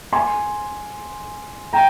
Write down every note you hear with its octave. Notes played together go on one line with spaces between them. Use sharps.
G#5 C6
G5 A#5